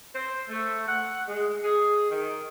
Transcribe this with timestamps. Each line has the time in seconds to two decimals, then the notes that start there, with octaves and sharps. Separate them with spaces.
0.14 C5
0.49 A3
0.88 F#5
1.28 G#3
1.63 G#4
2.10 D#3